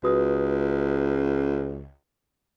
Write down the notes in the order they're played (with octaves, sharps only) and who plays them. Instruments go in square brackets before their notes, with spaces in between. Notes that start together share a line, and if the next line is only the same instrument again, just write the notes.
[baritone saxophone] C#2 [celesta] F#4 B4 D#6